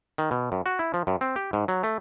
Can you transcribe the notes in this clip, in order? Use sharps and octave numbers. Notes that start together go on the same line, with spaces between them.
D#3
B2
F#2
F#4
E4
F3
F#2
C4
G4
G#2
F#3
A3